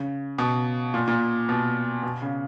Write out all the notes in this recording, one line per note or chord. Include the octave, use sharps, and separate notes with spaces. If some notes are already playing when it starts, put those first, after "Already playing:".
Already playing: C#3
B2
A#2
A#2
B2
B2
C#3